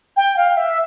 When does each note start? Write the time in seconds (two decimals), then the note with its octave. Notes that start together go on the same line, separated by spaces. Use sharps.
0.17 G5
0.37 F5
0.57 E5